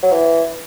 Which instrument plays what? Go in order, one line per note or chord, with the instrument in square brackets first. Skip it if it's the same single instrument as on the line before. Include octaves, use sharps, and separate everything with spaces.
[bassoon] F#3
E3